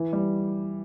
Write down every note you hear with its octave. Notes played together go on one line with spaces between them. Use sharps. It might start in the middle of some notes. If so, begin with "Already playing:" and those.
Already playing: E3
G3